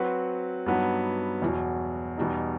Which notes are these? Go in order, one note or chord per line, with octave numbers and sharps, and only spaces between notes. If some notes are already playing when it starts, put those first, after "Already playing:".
Already playing: F#3 C4 F#4 B4
G2 F#3 B3 D#4
E2 B2 F#3
E2 B2 G3 D#4